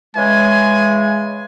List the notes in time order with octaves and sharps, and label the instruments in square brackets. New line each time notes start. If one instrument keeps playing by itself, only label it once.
[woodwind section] C#3 E3 G#3 [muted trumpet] G#5